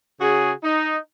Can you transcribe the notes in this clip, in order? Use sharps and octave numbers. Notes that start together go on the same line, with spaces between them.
C#3 F#4 G#4
D#4